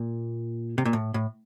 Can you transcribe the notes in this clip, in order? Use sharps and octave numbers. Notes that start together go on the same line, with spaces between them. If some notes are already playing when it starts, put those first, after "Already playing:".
Already playing: A#2
C3
A#2
A2
A2